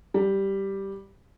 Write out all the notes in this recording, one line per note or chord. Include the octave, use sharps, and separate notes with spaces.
G3